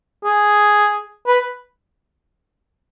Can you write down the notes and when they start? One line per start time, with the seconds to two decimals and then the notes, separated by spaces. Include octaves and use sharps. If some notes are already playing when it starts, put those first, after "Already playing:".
0.24 G#4
1.27 B4